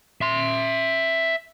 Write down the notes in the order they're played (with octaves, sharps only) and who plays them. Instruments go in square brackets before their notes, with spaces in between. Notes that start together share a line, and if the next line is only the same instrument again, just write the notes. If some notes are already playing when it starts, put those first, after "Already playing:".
[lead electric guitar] E5 C6